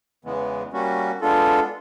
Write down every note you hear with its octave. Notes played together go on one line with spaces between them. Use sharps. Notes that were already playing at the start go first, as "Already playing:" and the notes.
E2 C#3 E3 G#3 B3
G3 A#3 C#4 F#4
G#3 B3 D4 F4 A4